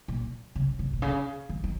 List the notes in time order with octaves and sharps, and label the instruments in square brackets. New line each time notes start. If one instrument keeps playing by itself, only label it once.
[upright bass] A#2
C#3
C#3
A#2
C#3
D#3
D#3